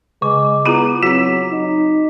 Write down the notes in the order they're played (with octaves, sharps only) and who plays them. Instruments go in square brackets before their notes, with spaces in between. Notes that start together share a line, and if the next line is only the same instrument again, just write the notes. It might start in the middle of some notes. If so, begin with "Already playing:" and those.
[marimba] C#3 [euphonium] G#3 [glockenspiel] D6
[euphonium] B3 [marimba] E4 F4 G#4 [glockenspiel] A#5 B5
[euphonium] F#3 [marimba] C4 F#4 [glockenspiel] B6
[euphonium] D#4